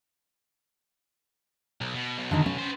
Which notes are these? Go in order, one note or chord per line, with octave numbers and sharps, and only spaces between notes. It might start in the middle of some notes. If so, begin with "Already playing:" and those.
B1
B2
B1 B2
D3 D#3 D#4
C#4
B3 C5